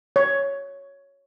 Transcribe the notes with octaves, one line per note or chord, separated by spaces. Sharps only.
C#5